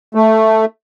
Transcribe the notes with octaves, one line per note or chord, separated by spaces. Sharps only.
A3